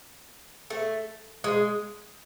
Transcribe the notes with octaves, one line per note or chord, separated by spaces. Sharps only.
A3
G#3